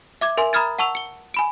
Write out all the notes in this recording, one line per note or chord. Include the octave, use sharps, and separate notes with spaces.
E5 D6 G#6
A#4 E5 G#5 C6
A#5 B5 D#6 F6 G#6 A6
F#5 A5 C#6 E6 F7
C#7 G7
G#5 B5 D7